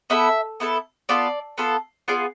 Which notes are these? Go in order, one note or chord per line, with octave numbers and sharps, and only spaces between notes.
B3 E4 A4 E5
B3 E4 A4
B3 F4 A4 D5
B3 F4 A4
B3 F4 G#4 D5